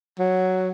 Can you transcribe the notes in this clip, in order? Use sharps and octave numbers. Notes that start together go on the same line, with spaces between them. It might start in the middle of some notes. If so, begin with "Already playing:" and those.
F#3